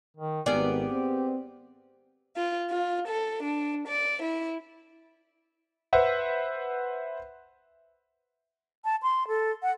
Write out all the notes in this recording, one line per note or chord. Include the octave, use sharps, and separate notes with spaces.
D#3
G#1 B3 G4 G#4 A#4 D5
C4
F4
F4
A4
D4
D5
E4
B4 C5 E5 F#5
A5
C6
A4
F#5